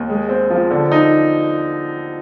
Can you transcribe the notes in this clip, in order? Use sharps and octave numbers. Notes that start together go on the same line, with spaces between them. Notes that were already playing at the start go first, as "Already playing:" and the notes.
Already playing: D#2
G#3
C4
F3
D3
D#4